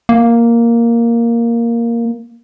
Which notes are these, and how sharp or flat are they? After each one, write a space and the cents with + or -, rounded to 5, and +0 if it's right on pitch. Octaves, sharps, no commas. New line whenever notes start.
A#3 +0